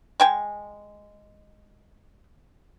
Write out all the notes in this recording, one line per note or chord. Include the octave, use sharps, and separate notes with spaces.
G#3 G5 G#5